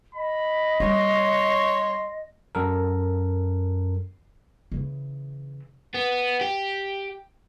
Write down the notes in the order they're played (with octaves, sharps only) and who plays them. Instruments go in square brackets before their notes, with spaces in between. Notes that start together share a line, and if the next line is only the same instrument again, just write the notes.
[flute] D#5 [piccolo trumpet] B5
[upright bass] G3 [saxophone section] C#5 [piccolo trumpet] C6
[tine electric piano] F#2 A4 A#4
[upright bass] C#3 E3
[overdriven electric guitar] B3
G4